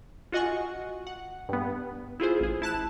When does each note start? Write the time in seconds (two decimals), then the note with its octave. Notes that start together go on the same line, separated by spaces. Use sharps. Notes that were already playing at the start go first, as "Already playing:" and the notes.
0.32 F4 F#4 D#5 F#5 G#5 C#6
1.07 F#5
1.49 G2 B3
2.20 E4 F4 G#4 C5
2.40 A1 G#4
2.62 E4 A5 F#6 E7